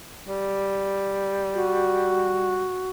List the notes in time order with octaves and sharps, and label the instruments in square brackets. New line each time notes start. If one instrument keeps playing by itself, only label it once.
[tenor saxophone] G3
[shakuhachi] F#4